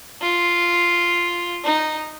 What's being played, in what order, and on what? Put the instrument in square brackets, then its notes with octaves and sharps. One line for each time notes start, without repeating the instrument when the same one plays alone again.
[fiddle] F4
D#4